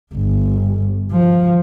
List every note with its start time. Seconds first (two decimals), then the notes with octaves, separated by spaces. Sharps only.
0.14 G1
1.12 F3